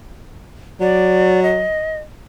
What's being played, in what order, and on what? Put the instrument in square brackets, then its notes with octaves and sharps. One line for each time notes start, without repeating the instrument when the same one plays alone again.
[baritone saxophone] F#3 [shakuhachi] D5
[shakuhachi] D#5